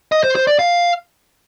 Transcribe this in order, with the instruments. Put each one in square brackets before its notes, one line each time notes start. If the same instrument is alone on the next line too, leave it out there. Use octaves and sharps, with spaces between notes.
[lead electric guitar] D#5
C5
C5
D5
F5